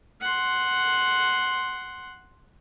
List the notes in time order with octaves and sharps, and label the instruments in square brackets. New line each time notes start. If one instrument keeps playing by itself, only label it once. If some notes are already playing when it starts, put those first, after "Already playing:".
[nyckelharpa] F#5 C6